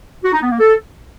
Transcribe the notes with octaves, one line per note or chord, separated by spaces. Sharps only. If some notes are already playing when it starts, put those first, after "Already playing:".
F#4
D#4
B3
A#3
A4